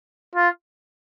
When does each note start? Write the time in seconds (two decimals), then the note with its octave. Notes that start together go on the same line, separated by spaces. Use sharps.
0.36 F4